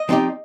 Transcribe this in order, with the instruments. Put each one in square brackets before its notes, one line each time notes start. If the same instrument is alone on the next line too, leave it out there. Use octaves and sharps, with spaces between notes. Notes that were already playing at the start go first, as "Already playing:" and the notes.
Already playing: [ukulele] D#5
[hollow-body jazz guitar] F3 C4 D#4 G4 D5